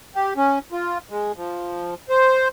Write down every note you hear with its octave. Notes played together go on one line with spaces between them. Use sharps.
G4
C#4
F4
G#3
F3
C5